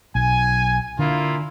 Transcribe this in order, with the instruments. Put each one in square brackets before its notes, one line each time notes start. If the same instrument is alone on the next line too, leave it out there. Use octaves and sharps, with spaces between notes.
[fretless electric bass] B1 [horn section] G#5
[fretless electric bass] D3 [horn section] A#3 E4 F4